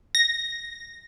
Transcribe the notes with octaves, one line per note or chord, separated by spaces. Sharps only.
A#6